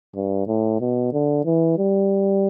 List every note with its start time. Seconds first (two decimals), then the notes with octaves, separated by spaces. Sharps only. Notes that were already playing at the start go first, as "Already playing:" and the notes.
0.15 G2
0.47 A2
0.80 B2
1.13 D3
1.45 E3
1.78 G3